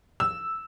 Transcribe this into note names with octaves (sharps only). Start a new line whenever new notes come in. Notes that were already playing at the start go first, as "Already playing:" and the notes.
E6